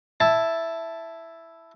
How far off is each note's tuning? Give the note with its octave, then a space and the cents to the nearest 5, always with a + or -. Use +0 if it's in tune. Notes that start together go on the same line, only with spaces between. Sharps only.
E4 +0 A5 +0